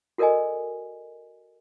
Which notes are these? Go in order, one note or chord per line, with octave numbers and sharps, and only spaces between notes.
F#4 A4 A#4 D5 D#5 G#5